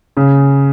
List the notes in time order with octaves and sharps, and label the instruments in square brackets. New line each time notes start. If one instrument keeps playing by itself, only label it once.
[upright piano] C#3